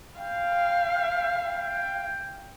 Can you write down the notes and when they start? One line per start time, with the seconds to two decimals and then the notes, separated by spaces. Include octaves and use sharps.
0.19 F5 G5
1.45 G5